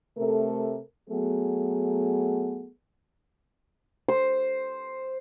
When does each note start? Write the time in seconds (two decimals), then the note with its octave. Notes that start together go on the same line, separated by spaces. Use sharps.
0.17 C3 A3 A4 A#4
1.09 F#3 A3 B3 G#4
4.08 C5